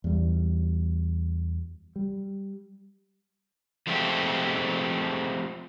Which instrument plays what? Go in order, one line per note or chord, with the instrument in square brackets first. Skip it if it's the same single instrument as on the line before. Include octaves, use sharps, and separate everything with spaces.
[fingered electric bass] E2 G3
G3
[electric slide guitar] F3 G#3 A3 C4 E4 G4